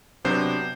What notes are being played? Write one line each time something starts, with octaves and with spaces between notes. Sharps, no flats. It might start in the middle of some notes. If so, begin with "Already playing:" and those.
C3 F#3 B3 D4 C5